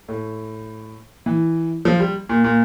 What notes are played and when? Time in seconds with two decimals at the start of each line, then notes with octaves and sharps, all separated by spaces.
0.08 A2
1.26 E3
1.85 F3
2.00 G3
2.29 A#2
2.44 A#2